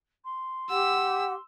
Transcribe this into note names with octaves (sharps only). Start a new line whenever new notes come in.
C6
G4 F#5 E6